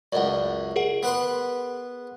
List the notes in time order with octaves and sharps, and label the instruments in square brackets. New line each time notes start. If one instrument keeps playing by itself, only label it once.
[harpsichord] C#2 F#2 [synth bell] D5 D#5 F#5
[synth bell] G#4 A#4 F#5
[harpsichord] B3 B4 C6